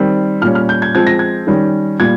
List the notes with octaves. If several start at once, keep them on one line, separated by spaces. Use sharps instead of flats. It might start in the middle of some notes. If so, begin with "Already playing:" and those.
Already playing: D#3 G3 C4
A#2 G3 C#4 F6
F6
G6
G#6
F3 G#3 C4 G#6
A#6
G#6
D#3 G3 C#4
A#2 G3 G#6